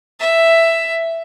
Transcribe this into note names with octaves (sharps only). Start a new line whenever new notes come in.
E5